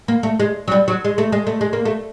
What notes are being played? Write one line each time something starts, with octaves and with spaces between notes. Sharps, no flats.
A#3
A3
G#3
F#3
G3
F#3
G#3
A3
G#3
A3
G#3
A#3
A3